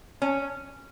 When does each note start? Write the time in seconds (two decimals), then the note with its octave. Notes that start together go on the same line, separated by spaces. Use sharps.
0.22 C#4